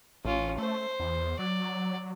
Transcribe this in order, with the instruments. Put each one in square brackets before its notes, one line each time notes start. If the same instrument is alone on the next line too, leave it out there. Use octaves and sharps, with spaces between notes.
[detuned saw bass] A1 [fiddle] C#4 F4
[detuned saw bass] A3 [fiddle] C5
[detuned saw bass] E2
[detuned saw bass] F#3 [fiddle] D5